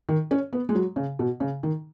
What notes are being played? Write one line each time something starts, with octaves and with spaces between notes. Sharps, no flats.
D#3
C#4
B3
G#3
F#3
C#3
B2
C#3
D#3